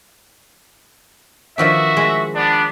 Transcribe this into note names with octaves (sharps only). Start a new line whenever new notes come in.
D#3 F3 D4 F#4 E5
G#3
B3 D4